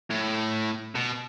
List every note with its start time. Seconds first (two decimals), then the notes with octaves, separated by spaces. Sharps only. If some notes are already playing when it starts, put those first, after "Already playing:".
0.11 A2
0.95 B2